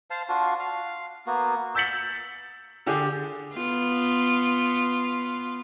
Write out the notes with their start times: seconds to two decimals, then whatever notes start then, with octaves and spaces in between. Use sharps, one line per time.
0.10 C5 F5 A5
0.29 D4 F4 F#4
0.59 F5
1.26 A#3 B3 F#4
1.75 E6 G6 A6 B6 C#7 F#7
2.86 D3 D4 G4 G#4 D6
3.54 B3 F4